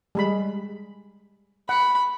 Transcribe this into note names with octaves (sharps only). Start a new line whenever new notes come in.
G3 G#3 B5
F#5 B5